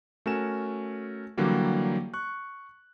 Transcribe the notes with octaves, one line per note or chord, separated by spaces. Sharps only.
A3 C#4 F#4 A#4 G#5 E7
D3 E3 F#3 G3 A#3 G4
C#6 F#6